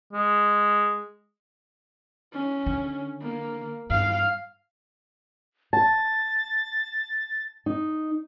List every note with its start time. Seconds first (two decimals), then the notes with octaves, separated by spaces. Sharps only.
0.13 G#3
2.33 C#4
2.67 D3
3.22 A#3
3.90 G2 F5
5.73 A5 A6
7.66 D#4